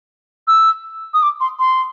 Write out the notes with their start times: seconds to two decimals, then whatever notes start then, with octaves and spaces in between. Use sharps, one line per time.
0.48 E6
1.14 D#6
1.23 D6
1.41 C6
1.59 C6